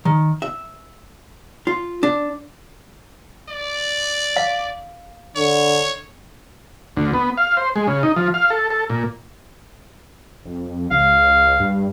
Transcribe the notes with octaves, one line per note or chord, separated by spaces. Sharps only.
D#3
E5
F4
D4
D5
F5
D3 C#5
D2
B3
F5
C5
G#3
C#3
D#4
F3
F5
A4
A4
A#2
F2
C#2 F5
G2